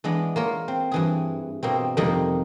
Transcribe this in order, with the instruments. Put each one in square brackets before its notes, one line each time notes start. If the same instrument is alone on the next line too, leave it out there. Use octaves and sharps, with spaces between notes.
[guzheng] E3 G#3 B3 D4
A#3 F4 C#5
C4
G2 E3 G#4
B2 A#3 C4
F2 C3 D#3 G3 A#3 D#4